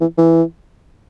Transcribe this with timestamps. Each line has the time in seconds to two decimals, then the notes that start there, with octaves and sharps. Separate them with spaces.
0.01 E3
0.18 E3